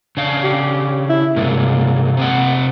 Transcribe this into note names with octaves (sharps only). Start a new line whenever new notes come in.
C#3 D4 F5
G4
E4
G2 C3 G#3 A#3
C3 C4 F#5